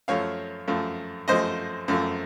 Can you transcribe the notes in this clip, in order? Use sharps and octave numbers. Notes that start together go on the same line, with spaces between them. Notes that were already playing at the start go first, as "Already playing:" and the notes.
F#2 F3 A3 C#5 F5
F#2 F3 A3
F#2 F3 A3 C5 D#5
F#2 F3 A3